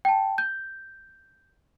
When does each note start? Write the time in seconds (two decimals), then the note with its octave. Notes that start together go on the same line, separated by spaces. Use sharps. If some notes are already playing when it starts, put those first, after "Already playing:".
0.05 G5 A5
0.38 G6